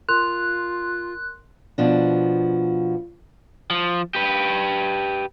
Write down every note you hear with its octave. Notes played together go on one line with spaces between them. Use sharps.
F4 A#4 C6 F#6 F7
B2 F3 D4
F3
G4 B4